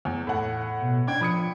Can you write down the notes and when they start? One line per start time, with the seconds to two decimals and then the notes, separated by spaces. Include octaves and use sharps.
0.05 E2
0.27 A2 F#5
0.80 B2
1.07 D4 D5 G5 G#6
1.21 F3 B5 D#6 C#7